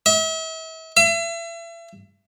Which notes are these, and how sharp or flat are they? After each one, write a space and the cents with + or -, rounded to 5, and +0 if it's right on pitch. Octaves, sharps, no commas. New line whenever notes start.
E5 -40
E5 +35